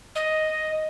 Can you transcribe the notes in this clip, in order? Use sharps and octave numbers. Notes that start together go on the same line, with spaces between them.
D#5